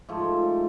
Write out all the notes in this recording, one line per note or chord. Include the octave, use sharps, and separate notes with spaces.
G#2 F3 A3